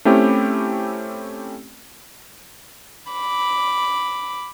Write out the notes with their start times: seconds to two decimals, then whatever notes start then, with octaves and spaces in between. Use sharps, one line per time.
0.05 A3 C4 C#4 E4 G4
3.12 B5 D6